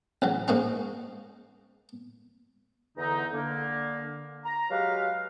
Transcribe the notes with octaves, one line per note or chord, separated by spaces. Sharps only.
A1 C#3 F#3
G#2 A#3 C#4 D#4
E2 D3 D#4 A#5
D3 A#3
A#5
F#3 G#3 G4 B4 F5